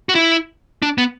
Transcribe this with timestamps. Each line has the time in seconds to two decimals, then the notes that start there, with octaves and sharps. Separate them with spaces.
0.09 F#4
0.15 E4
0.82 D4
0.98 B3